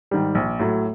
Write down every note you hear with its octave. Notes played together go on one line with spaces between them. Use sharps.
G#2 D#3 G3
A#1
A2 F#3